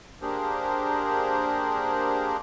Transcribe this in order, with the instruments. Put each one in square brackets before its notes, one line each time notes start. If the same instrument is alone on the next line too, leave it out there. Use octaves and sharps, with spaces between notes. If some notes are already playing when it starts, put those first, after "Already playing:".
[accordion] A#3 D4 G4 G#4 A#4 C5